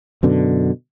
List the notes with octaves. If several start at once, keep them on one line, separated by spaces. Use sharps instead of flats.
F#2 B2 D3